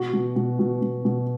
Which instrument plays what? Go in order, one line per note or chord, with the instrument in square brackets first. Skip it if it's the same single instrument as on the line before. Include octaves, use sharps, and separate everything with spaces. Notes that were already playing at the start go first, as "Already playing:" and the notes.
Already playing: [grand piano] B2 F#4
B2
B2
B2
B2
B2